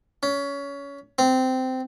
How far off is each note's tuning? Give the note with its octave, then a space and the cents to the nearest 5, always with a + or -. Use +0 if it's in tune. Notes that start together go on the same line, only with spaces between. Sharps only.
C#4 +25
C4 -15